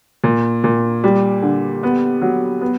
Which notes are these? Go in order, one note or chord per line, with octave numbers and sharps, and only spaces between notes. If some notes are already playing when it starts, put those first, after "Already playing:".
A#2
A#2
G3
D3
B3
F#3
B3